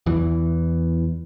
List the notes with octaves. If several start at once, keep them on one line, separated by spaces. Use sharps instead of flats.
E2 E3